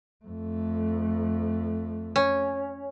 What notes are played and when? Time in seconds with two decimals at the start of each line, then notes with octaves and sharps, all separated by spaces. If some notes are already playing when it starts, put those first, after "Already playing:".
0.25 F2 A3
2.16 C#4